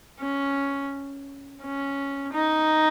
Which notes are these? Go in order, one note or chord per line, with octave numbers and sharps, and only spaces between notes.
C#4
C#4
D#4